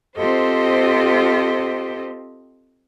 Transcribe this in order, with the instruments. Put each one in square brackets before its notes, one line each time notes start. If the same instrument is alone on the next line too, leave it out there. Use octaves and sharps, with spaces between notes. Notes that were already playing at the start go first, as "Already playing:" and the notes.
[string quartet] C4 F4 G4 A4 C5 D#5